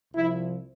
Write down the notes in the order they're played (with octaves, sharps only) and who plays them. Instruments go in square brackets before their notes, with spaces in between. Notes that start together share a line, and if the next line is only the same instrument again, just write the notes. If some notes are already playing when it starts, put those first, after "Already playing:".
[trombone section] C2 C3 F3 E4